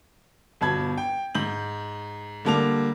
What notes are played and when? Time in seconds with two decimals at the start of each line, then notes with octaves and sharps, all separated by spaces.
0.61 G1 B2 A5 B5 G#6
0.97 G5
1.35 G#2 G6 F#7
2.45 D3 G3 A#3 A5 D6 F7